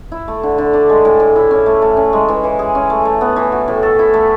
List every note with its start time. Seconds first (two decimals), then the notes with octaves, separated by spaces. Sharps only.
0.12 E4
0.28 A3
0.43 D3
0.58 D3
0.73 D4
0.89 G#3
1.05 A2
1.20 A2
1.36 E4
1.51 C#4
1.66 A3
1.82 A3
1.97 C#4
2.13 G#3
2.28 E3
2.44 E3
2.59 G#4
2.75 C#4
2.90 A3
3.05 A3
3.21 B3
3.36 E3
3.52 F#4
3.68 A2
3.83 A4
3.99 E4
4.14 A3